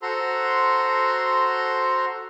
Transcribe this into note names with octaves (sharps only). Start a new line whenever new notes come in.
F#4 A4 C5 A#5 C6